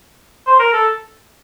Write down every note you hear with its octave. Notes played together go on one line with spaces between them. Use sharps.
C5
A#4
A4